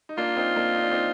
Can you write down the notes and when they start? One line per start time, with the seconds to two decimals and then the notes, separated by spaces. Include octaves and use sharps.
0.09 D#4
0.18 A#3 D4 F4
0.36 C4 D#4
0.56 A#3 D4
0.75 D#4
0.83 D4
0.91 C4 D#4